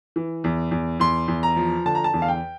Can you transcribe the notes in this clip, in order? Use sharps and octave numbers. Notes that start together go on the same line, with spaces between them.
E3
E2
E2
E2 C6
E2
A#5
F3
D3 A5
A#5
A5
E2
F5
G5